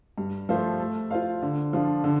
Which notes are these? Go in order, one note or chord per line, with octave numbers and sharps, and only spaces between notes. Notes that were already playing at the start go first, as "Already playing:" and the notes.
G2
F3 A3 F4 C5
A3
F4 C5 F5
D3
F3 D4 F4
D3